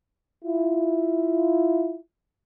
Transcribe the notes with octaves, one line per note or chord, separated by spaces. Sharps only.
E4 F4